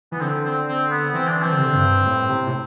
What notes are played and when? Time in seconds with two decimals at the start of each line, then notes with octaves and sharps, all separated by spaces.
0.12 E3 B3
0.21 D3 C4
0.44 C4
0.67 C4
0.90 B3
1.13 E3 C4
1.27 D4
1.42 E3 C4
1.52 D3
1.59 C3
1.65 D3
1.75 G2
2.06 A2
2.29 C3
2.47 A2